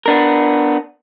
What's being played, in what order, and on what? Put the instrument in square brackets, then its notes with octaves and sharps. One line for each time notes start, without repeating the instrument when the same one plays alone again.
[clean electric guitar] B3 D4 A#4